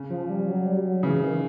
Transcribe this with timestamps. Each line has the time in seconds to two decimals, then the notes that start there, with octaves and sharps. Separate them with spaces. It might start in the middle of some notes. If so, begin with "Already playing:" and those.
Already playing: C#3
0.10 F3
0.28 G3
0.48 F#3
0.66 G3
0.76 F#3
1.03 C#3 E3
1.22 D#3